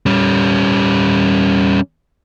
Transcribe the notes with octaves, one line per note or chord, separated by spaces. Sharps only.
G3 C#4